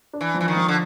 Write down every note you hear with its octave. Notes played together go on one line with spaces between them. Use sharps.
D4
E3
F3
E3
D#3
F3
D3